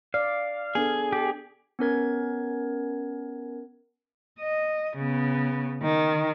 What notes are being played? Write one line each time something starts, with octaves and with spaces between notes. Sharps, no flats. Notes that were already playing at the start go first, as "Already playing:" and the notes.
D5 F5
B3 D4 G#4 A4
G4
B3 C#4 A#4 G#6
D#5
C#3 B3
D#3